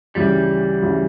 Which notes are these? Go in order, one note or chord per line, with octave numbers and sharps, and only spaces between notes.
D2 C#3 E3 G3
D2 C#3 E3